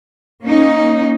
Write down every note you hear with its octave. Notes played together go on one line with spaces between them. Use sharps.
A#3 C#4 D#4